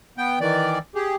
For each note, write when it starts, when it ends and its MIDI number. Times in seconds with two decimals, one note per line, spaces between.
0.18 0.39 59
0.18 0.39 79
0.41 0.79 51
0.41 0.79 52
0.41 0.79 74
0.95 1.16 67
0.95 1.16 68